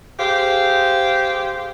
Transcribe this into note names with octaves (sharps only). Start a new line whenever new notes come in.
G4 G#4 C5 F5